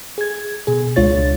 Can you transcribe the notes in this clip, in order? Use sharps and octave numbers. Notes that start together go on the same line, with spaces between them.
G#4 G#6
B2 G#4
C#2 G#3 D4 F4 C#5 A6